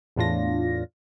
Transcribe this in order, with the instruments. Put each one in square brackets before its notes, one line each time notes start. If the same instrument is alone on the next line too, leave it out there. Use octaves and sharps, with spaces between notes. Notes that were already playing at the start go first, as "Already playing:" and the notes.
[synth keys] E2 A2 D4 F4 A#6